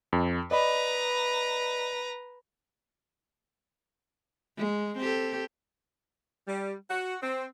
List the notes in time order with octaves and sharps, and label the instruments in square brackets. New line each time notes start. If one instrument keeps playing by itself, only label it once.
[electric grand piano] F2
[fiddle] B4 A#5 [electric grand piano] D5 D#5 B5
[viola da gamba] G#3
C4 G4 A4
[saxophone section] G3
F#4
C4